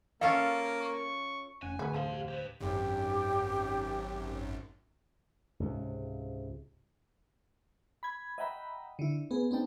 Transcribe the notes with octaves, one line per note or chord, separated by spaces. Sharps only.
A#3 C#4 F4 A4 F5
C#6
F1 C#4 F#5 G#5
D2 A2 D3 B3 F#4 G#4
F2 F3 C6
G4 F5 F#5
G4 B4 C5
G#1 F#2 G4
C#2 G#2 C3
B5 G#6
D#5 E5 F#5 G5 A#5 B5
D3 E4
B3 G#4
B3 C4 D4 D#4 G5 A5